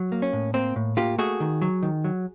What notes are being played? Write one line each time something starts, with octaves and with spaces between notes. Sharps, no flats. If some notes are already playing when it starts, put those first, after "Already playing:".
Already playing: F#3
A#3
C#4
A2
A#3 C4
A2
A#3 F4 G4
A3 F#4 G#4
D#3
F#3
D#3
F#3